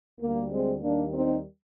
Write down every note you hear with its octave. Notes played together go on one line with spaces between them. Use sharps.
D2 D3 G3 A#3
G#3 C4
D#2 D#3 G3 A#3 D4
C4 D#4